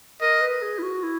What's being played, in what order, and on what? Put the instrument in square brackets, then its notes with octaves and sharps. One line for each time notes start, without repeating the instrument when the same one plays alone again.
[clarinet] A#4 [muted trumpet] D#5
[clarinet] B4
G#4
E4
F#4
E4